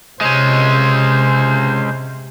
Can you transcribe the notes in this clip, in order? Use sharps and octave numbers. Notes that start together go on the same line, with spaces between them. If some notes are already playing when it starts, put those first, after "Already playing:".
C3 G#3 C#4 C5